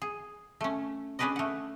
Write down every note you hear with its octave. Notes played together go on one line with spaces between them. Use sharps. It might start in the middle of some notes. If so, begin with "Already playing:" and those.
G#4
A3 C#4
C#4 D4 G#4 B4 D5 D#5
A3 F#5